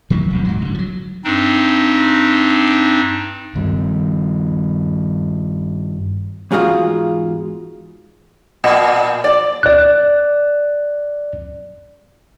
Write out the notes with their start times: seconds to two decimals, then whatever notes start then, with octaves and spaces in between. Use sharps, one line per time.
0.10 D#3 F#3 A3 A#3
0.30 D#1 C2 F2
0.45 G#2 F#3
0.62 A#2 D3
0.74 F3 F#3
1.24 G2 C4 D4 D#4
3.55 G2 D#3
6.51 E2 G#2 F4 F#4 G#4 F5
8.64 A#2
9.24 D5
9.63 D5 F#6